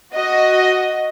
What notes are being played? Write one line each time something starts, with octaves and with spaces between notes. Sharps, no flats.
F#4 D#5